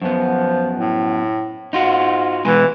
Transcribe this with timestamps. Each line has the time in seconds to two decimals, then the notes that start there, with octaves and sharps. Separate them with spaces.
0.02 F#2 F3 B3
0.77 A2
1.73 G#2 D#4 F4 F#4
2.45 B2 E3 G#3 B4